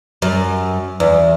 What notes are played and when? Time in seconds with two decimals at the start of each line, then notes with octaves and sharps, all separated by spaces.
0.22 F#2
1.00 E2